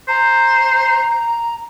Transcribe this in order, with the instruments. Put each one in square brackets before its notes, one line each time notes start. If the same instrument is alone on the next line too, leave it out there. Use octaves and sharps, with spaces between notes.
[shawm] C5 [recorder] A#5